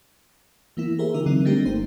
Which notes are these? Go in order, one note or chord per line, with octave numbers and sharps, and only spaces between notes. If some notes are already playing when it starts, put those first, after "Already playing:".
E3 A#3 B3 E4
G4 G#4 A#4 C5 E5
D3 E3 D#4 F4 A#4
D3 F#3 C4 D#4
G3 A3 A#3 C4 D4 G4
G1 D#4 C5